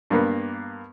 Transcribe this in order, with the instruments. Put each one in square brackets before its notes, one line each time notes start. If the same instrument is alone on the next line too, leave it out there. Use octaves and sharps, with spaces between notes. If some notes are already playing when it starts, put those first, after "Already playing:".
[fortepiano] G2 A#3 B3